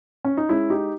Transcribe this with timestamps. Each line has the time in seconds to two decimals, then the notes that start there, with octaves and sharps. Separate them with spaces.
0.25 C#4
0.37 D#4
0.49 G#3 C#4 E4
0.70 D#4 G4